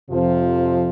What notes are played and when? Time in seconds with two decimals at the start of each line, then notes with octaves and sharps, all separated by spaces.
0.10 F2 C3 F3